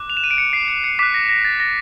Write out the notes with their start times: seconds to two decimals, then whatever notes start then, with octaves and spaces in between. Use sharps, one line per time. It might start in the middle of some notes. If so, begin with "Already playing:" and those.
Already playing: D6 F#6
0.10 F7
0.17 E7
0.24 D#7
0.31 D7
0.38 C#7
0.53 C7
0.68 C#7
0.84 C#7
0.99 D6 F#6 B6
1.14 A#6
1.29 A#6
1.45 A6
1.60 A#6